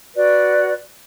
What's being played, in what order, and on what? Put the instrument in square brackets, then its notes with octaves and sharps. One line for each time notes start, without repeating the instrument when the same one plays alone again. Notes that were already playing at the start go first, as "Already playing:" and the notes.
[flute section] F#4 B4 D5